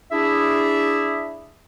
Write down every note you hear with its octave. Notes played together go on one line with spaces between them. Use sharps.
D4 E4 G#4 E5